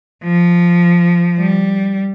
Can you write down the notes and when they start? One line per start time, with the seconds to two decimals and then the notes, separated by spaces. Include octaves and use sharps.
0.24 F3
1.39 G3